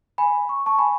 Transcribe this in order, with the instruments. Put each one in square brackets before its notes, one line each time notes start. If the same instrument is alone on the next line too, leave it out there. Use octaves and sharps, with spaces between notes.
[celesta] G#5 B5
C#6
A5 C#6
G#5 B5